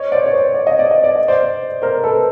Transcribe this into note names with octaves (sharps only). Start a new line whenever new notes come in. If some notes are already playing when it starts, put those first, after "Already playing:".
Already playing: C#5 D#5
C5 D5
C#5
C5 D5
D5
D#5
D5
D#5
D5
D#5
C5 D5
A#4 C5
A4 B4